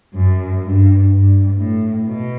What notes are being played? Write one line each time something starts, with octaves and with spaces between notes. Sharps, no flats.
F#2
G2
G2
A2
B2